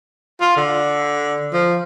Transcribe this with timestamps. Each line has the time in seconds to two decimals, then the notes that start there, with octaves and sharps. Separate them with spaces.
0.41 F4
0.57 D3
1.53 F3